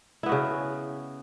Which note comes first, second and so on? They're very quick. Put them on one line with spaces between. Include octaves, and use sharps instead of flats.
E4 B3 F#4 C#3